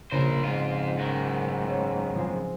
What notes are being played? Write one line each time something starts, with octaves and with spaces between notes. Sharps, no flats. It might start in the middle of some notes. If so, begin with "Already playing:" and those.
A#1 C#3 A#4 C5
F2 G#2 F4
F#2 D#3 A#6
C#5
F3 G#3 C4